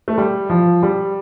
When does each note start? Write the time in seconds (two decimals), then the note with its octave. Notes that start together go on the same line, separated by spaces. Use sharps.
0.08 A3
0.18 G3
0.50 F3
0.83 G3